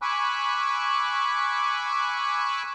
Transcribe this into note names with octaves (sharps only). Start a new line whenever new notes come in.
G#5 B5 C#6 D6 E6 F#6